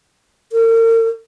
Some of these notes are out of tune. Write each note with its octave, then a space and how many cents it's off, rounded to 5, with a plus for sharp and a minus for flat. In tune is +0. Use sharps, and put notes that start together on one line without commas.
A#4 -40